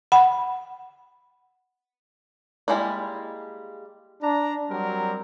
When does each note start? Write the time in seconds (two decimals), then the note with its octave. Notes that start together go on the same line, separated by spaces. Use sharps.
0.12 F#5 B5
2.68 G3 G#3 A#3 E4
4.22 D4 A#5
4.70 F#3 G3 C4 A#4